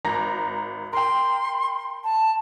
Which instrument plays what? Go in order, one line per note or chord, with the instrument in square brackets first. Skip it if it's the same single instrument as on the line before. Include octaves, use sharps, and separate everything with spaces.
[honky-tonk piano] G#1 A#5 A#6
[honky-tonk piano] A#4 G5 [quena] C6
[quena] A5